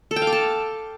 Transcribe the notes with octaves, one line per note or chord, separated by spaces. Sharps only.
A4
G5
F5
D6
A5